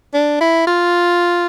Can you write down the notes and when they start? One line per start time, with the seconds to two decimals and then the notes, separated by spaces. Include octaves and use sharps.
0.14 D4
0.40 E4
0.67 F4